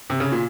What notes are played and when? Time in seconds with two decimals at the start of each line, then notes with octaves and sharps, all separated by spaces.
0.10 C3
0.20 C#3
0.32 A#2